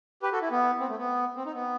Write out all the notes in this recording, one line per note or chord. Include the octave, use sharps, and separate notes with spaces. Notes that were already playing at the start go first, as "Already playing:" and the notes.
G4 B4
F#4 A4
E4
B3
C4
A3
B3
C4
D#4
B3